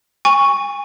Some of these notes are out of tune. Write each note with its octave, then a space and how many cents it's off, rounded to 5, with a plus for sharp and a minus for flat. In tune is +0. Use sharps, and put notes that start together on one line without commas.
G#5 -35 C#6 +0